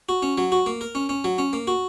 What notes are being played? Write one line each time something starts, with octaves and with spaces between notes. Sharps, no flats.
F#4
C#4
F#3
F#4
A#3
A#4
C#4
C#4
F#3
C#4
A#3
F#4